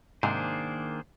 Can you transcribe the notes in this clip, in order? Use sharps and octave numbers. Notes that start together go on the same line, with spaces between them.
G#2 C3 D#3 A#3 D4 G#4 C5